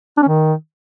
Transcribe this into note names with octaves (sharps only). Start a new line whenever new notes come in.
D4
C#4
D#3